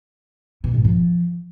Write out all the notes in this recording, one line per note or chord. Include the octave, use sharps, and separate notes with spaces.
B2
G#2
F3